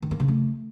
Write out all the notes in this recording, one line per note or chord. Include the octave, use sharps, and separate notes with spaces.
D#3
A#3
C#3
A3